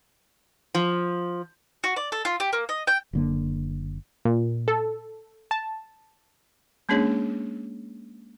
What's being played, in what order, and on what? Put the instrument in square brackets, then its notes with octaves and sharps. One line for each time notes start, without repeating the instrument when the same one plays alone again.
[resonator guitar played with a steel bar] F3
[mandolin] F#4
D5
A4
F4
G4
A#3
D#5
G5
[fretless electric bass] F#1 D3 A#3
[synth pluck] A#2
A4
A5
[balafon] G#3 A#3 C#4 D4 G#4 C#5